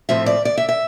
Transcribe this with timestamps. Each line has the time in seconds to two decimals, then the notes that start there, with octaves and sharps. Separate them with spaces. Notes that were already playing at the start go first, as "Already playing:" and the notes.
0.09 A2 F3 C4 E5
0.26 D5
0.45 D5
0.57 E5
0.69 E5